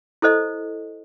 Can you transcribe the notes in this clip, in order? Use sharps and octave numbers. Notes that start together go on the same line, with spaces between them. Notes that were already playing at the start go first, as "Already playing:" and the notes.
E4 A4 C5 D#5